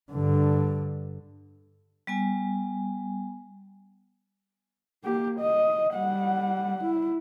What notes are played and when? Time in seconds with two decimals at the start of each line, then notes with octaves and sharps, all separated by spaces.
0.12 G2 D3
2.07 G3 B3 G#5
5.04 A#3 G4
5.40 D#5
5.94 G3 F#5
6.84 E4